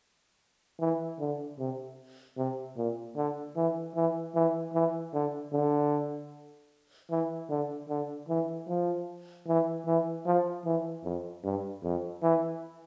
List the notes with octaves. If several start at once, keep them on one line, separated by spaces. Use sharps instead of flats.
E3
D3
C3
C3
A#2
D3
E3
E3
E3
E3
D3
D3
E3
D3
D3
E3
F3
E3
E3
F3
E3
F2
G2
F2
E3